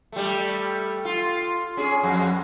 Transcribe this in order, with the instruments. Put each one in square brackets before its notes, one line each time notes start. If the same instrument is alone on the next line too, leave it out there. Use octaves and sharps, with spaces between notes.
[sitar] G3 A3
F4
C#4 G#4
F2